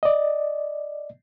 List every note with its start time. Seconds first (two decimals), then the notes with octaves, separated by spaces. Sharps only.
0.03 D5 D#5